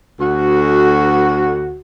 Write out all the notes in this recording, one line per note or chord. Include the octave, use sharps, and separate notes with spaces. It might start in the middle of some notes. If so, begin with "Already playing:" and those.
D2 F#4